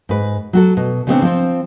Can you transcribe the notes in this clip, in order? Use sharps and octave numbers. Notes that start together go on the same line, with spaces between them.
G#2 B4
F#3 F#4 A4
B2
C#3 F3 G#3 B3 C4 D4
F3 C4